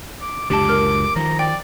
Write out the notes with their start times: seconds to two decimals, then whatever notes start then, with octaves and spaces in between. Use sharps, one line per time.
0.21 D6
0.50 C#2 F#2 D3 G4 A5 D6
0.69 A#4 F6
1.16 D#3 F3 A#5
1.39 D5 G5